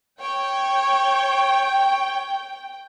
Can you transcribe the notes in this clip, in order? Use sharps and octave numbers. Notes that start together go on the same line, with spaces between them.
C#5 G5